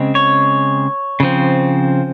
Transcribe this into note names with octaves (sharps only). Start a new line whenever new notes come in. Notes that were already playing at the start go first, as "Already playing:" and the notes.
Already playing: C#3 G#3 C4
C#5
C#3 F3 C4